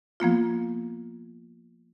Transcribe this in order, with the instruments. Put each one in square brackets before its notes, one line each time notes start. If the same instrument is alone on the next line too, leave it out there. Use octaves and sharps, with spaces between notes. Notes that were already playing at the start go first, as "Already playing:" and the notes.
[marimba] F3 A#3 B3 F4